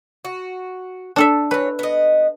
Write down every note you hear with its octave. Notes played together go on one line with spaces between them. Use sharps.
F#4
D4 A4 E5
E3 B4 C#5
B3 D#5